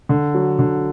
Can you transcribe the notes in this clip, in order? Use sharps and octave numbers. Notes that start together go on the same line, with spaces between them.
D3
F#3
D3